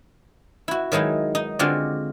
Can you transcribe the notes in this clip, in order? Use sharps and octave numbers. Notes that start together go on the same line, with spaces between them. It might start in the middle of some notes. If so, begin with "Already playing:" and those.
E4 F#4
D#3 F#3 G#3 D#4 E4
D#4
D3 G#3 C4 F4 F#4 D5